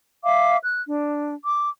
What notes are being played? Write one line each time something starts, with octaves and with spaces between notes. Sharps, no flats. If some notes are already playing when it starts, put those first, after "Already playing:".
E5 F5 D6
F#6
D4
D6